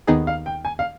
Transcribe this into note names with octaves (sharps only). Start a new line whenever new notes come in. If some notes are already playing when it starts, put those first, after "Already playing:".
D#2 D#3 B3 D#4 G#4
F5
G5
G#5
F5